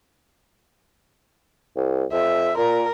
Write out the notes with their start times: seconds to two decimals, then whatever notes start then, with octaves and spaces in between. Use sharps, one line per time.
1.76 C2
2.12 F2 E5
2.57 A#2 A#4